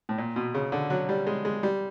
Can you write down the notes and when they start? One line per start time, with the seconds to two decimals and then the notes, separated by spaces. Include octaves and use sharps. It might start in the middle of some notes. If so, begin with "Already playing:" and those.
0.09 A2
0.18 A#2
0.36 B2
0.54 C#3
0.72 D3
0.90 F#3
1.09 G3
1.27 G#3
1.45 G#3
1.63 G3